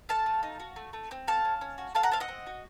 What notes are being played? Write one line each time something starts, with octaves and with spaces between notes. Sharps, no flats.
A4 F5 A5
A3
D#4
F#4
A3
A3
C4
A4 F5 A5
C#4
C#4
F#4
A4 F5 A5
F#5 A#5
C4 F5 A5
D#5 F#5
C4
F#4